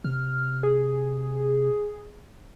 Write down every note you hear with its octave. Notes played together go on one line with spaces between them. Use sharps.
C3 F6
G#4